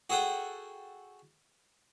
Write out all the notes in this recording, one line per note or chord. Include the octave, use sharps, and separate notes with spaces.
F#4 G#4 A4 F#5 G5